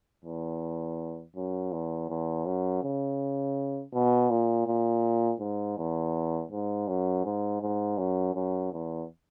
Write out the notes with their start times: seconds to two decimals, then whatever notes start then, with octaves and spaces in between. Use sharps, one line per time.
0.24 E2
1.36 F#2
1.72 E2
2.09 E2
2.45 F#2
2.83 C#3
3.93 B2
4.30 A#2
4.67 A#2
5.40 G#2
5.77 E2
6.51 G#2
6.88 F#2
7.25 G#2
7.61 G#2
7.98 F#2
8.35 F#2
8.72 E2